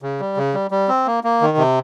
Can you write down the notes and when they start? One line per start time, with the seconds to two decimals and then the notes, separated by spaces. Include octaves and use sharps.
0.02 C#3
0.20 G3
0.37 C#3
0.54 G3
0.71 G3
0.88 C4
1.06 A#3
1.24 A#3
1.41 D#3
1.57 C3